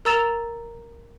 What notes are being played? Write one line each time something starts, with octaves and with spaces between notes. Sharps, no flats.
A#4 A#5 E6 A6 E7 F7